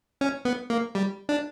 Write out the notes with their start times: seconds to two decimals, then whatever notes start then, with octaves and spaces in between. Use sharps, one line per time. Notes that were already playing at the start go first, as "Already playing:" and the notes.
0.21 C#4
0.45 B3
0.70 A#3
0.95 G3
1.29 D4